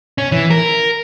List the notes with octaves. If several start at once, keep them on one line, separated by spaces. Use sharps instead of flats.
C#4
E3
A#4